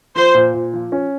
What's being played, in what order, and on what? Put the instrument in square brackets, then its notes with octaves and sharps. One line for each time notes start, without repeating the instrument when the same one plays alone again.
[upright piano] F3 [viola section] C5
[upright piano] A#2
A#2
F3
C#4